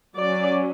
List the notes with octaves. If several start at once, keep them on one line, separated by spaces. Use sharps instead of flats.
F#3 D5
C#4